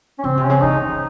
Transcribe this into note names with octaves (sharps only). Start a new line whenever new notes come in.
C#4
C#3 C4
C3
C#4
C#3
D#3 D#4